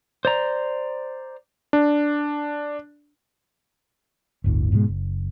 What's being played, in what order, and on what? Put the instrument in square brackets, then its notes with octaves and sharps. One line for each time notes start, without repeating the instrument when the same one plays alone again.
[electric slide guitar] C5 D5 A#5
[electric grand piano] D4
[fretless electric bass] G1 D2 A2
G#2 B2 D#3 G#3
F#1